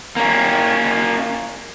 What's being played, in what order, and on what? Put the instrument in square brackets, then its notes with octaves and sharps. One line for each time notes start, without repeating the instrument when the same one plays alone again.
[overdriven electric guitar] A#3 C#4